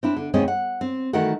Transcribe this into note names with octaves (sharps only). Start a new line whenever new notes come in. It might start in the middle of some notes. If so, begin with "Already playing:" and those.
C4 D4 E4
D3
D#2 B2 G#3 C4 C#4 D#5
F#5
C4
D#3 E3 A3 F#4 A#4 F#5